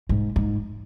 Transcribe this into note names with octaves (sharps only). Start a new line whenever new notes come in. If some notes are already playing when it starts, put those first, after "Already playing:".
G#2
G#2